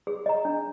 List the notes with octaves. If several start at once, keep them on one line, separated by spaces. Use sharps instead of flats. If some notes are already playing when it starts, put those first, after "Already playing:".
G#4
D#5 A#5
D4